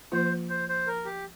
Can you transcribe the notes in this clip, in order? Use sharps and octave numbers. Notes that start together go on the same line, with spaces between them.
F3 A#3 F4 C5
C5
C5
A#4
G4